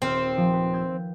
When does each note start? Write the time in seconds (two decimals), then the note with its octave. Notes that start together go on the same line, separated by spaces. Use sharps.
0.02 D#1 C4 F6
0.37 F3
0.53 B4
0.73 E6 G6 G#6